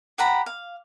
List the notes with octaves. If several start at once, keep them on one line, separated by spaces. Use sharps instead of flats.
G4 F#5 A#5 B5
F5